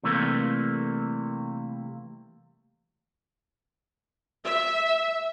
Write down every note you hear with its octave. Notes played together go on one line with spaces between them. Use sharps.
C3 E3 G3 A3 A#3
E5